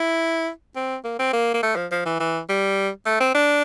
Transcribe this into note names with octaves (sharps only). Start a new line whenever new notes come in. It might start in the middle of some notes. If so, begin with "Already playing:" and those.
Already playing: E4
C4
A#3
C4
A#3
A#3
A3
F3
F3
E3
E3
G3
A3
C4
D4